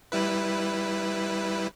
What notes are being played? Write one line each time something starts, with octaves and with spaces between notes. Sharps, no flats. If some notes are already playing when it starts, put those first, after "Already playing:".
G3 E4 B4